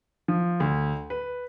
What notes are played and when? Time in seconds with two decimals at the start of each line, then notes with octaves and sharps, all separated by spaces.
0.28 F3
0.60 D2
1.10 B4